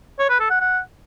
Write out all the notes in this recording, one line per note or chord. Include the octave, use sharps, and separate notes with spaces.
C#5
B4
A4
F#5
F#5